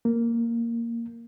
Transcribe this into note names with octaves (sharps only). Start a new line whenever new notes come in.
A#3